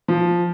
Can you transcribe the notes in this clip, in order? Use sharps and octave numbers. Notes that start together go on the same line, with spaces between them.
F3